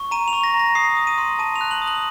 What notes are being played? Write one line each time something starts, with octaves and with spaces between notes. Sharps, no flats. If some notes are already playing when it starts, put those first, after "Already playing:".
Already playing: C#6
A#5 D#7
F7
C#6
A#6
A#5
A#6
D#6 C7
D#6
D#7
C6
A5 D#7
F7
F#6
F#7
D#6
F#7